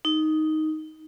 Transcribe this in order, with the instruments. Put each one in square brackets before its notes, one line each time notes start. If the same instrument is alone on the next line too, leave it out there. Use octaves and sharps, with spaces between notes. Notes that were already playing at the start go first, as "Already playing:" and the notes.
[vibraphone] D#4